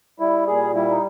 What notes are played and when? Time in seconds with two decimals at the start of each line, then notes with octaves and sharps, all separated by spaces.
0.20 G3 E4
0.47 A#2 G#4
0.74 G3 E4
0.90 D#4